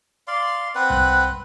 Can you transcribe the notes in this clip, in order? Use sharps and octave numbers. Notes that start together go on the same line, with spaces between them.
D5 F5 C6
C4 B4 F#5
C2 F#6